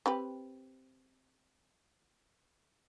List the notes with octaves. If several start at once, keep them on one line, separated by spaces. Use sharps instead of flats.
C4 G4 B4